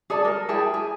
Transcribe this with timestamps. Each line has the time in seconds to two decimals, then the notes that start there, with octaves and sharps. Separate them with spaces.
0.10 G#4 A4 D5 A5
0.25 A4 A#4
0.49 E4 G#4 G5 A5
0.74 G#4